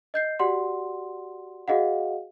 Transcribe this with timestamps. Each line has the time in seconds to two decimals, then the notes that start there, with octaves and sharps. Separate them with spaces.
0.14 D#5 G6 C7
0.39 F#4 G4 D5 F#5 C6
1.68 F#4 G#4 D#5 F5 F#5